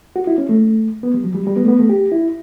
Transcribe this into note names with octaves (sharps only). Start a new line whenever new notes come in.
F#4
E4
C#4
A3
B3
G3
F#3
G3
G3
B3
A3
B3
A3
G4
E4